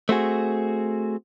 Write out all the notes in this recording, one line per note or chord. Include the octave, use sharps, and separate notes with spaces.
A3 C4 F#4 G#4